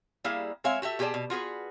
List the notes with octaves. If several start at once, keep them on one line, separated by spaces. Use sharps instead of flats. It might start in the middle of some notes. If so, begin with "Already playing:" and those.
G3 A#3 E4 G#4 F5
G#3 C4 C#5 E5 F5
F#4 G4 A4 E5
B2 G4 G#4 A#4 D5 A5
B2
F4 F#4 G#4 B4